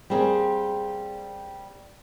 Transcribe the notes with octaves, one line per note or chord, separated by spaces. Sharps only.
G3 A#3 C4 G#4